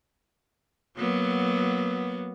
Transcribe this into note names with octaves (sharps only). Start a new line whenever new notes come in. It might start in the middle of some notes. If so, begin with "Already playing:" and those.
F#3 A#3 B3